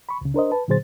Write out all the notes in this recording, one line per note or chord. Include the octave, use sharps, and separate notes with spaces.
B5 C#6
C#2 C#3
D4 A#4 C5 D#5
B4 A5
A#2 D3 F#3 G#4 C5 A6